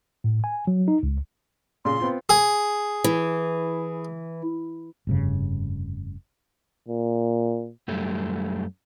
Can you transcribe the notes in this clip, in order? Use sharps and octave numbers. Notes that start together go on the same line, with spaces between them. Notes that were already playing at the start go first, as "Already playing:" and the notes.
A2
G#5
F#3
D#4
C#2
A#2 C#3 C6
B3 C4 F4
G#4
E3
F1 G2 C#3
A#2
F#2 G3 A3